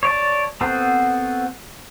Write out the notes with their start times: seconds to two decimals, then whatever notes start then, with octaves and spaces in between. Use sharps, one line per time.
0.03 C#5 D5 A5
0.61 B3 C4 F#4 A4 C5